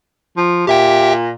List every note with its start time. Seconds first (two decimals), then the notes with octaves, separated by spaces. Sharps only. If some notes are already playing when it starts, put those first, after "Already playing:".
0.37 F3
0.67 A#2 G4 E5 G5